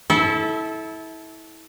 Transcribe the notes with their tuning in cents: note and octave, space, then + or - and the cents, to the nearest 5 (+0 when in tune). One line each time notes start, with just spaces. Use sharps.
E4 -25 A4 -20 E5 +0